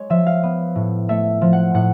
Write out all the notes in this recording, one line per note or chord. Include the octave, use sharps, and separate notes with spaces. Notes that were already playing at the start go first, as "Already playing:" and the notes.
Already playing: G#3 C#5
F3 E5
F5
B3
A2
A3 E5
F3
F#5
A2 F#5